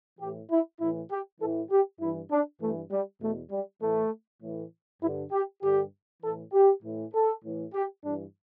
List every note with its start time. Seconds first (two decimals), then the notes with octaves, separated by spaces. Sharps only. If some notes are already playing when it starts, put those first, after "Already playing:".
0.19 A2 E3 G4
0.50 E4
0.80 A2 E3 E4
1.10 G4
1.40 A2 E3 A4
1.70 G4
2.00 G2 E3 E4
2.30 D4
2.61 G2 E3 A3
2.91 G3
3.21 E2 B2 A3
3.51 G3
3.81 A2 E3 A3
4.42 A2 E3
5.02 G2 E4
5.06 D3
5.32 G4
5.62 G2 D3 G4
6.23 A2 E3 A4
6.53 G4
6.83 A2 E3
7.13 A4
7.43 A2 E3
7.74 G4
8.03 G2 E3 D4